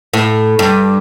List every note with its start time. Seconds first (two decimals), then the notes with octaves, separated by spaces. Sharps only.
0.13 A2
0.59 G2